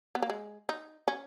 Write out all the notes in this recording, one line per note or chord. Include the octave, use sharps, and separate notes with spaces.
B3
A#3
G#3
D#4
C#4